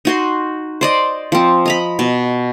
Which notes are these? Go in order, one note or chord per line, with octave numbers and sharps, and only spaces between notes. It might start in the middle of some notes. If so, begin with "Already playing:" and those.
D#4 F#4 C6
C5 D5 D#5
F3 C4
D#5 A#5 B5
B2